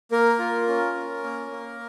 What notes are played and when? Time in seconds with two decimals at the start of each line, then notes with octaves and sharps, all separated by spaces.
0.11 A#3 A#4
0.39 F4
0.68 C#4
0.95 C#4
1.23 A#3
1.51 A#3